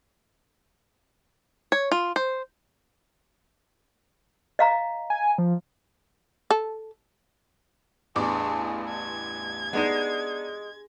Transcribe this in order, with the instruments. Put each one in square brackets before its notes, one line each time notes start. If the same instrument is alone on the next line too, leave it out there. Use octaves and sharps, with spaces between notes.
[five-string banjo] C#5
F4
C5
[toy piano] D#5 F5 A#5
[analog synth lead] G#5
F3
[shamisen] A4
[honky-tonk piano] A1 E2 D6 [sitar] G2 [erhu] G#4
[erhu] G#6
[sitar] G#3 [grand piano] B3 D4 D#4